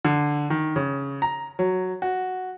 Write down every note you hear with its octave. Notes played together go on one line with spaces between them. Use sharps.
D3
D#3
C#3
A#5
F#3
F#4